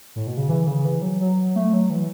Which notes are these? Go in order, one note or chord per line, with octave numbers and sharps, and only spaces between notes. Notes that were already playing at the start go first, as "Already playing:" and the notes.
A2
B2
C#3
E3
C#3
E3
F#3
F#3
A3
F#3
E3